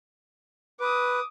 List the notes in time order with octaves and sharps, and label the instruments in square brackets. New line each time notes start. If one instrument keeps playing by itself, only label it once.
[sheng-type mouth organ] B4 [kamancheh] D6 D#6